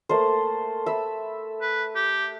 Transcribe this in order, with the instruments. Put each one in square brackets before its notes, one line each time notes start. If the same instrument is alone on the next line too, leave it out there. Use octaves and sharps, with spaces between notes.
[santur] A3 A#3 C5
E5 B5 E6
[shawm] B4
G4